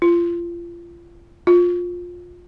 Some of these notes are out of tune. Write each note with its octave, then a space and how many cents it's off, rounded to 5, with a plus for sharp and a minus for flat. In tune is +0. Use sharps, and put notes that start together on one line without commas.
F4 -30
F4 +15